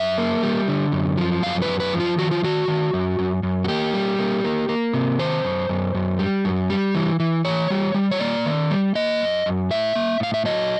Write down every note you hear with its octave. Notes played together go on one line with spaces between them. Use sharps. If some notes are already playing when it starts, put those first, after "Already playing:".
Already playing: F#2 E5
A#3
G3
D3
F#2
F3
F#2 F5
B4
F#2
B4
F3
F4
D#3 F#4
F4
D#3 F#4
D#3
F#2
F#2
F#2
F#4
A#3 G4
G3
A#3
A#3
A#3
C3
D#3 C5
F#2
F#2
F#2
G3
F#2
G3
E3
E3
E3 C#5
G3
G3
C#5
A#3 D5
D#3
G3
A#3 D#5
F#2
F#2
A2 E5
A#3
A2 F5
E5
F#3 D#5